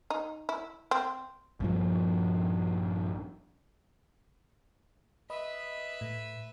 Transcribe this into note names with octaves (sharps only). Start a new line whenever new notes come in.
D#4
E4
C4
A#1 G2 F3
B4 D#5 E5 B5 D#6
A2